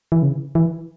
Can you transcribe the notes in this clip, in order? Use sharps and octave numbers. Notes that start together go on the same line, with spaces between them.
E3
C#3
E3